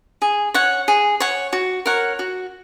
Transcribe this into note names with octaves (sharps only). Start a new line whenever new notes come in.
G#4
C#5 F#5
G#4
C#5 F#5
F#4
A#4 C#5 F#5
F#4